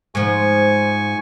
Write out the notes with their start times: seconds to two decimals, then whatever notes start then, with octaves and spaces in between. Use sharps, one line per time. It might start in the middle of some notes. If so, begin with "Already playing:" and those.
0.15 G#2 F3 G#5 C#6